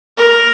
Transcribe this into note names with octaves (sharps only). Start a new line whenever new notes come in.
A#4